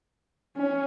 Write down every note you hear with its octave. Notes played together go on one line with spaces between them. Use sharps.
C#4